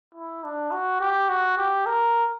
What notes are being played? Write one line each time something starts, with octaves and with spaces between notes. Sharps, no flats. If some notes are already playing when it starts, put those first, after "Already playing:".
E4
D4
F#4
G4
F#4
G4
A#4